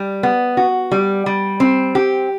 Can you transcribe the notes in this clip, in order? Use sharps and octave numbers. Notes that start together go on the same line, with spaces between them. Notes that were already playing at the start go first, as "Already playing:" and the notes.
Already playing: G3
B3
F#4
G3
G3
C4
G4